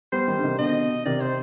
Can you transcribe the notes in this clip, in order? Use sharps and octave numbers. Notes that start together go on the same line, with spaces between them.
G3 B3 C5
D#3 G3
D3
C3 D#3
B2 D3 D#5
C3 D#3 D5
C5